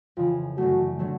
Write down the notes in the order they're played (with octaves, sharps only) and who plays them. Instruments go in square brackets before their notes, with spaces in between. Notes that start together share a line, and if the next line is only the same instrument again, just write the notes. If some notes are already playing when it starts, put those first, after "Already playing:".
[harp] F2 C#3 E3 [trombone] F4
[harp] F#2 D3 F#3 A3 [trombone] F#4
[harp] D3 F#3 A3